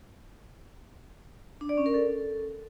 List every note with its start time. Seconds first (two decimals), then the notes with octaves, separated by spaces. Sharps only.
1.61 D4
1.69 D5
1.78 C#4
1.86 A#4
1.94 A4